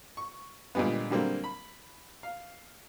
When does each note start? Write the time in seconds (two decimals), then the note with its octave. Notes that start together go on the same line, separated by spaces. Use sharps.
0.17 C#6
0.75 A#2 D3 G3 G#3 B3
1.10 D3 F#3 G3 A#3 C4
1.44 B5
2.23 F5